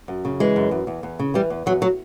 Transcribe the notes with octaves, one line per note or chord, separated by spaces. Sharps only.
F#2
C#3
E3 G#3
F#2
F#2
E2
E2
C#3
E3 G3
E2
E2 F#3
F#3